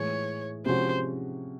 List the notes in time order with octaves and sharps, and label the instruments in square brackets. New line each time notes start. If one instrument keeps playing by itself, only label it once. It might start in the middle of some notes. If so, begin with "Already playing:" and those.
Already playing: [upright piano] A2 E3 G#3 [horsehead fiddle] C#5
[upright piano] C3 F3 G#3 C#4 F#4 [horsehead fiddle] C5